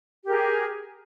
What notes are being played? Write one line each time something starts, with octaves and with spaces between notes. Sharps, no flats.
G4 G#4 A#4